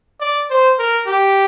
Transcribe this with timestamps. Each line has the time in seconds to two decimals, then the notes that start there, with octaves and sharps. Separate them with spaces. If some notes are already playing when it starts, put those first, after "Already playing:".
0.20 D5
0.50 C5
0.79 A#4
1.07 G4